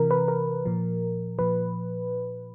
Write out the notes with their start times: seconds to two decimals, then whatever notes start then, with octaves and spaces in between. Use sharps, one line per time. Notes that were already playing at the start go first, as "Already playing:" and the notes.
Already playing: C3 E3 A#4
0.11 B4
0.28 A#4
0.65 A#2 F3
1.39 A#2 F3 B4